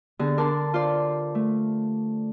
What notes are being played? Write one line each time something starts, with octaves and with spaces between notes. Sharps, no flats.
D3 B3 G4 G#4
D4 A#4 D5 A5 C6
F4 C5 D5
A3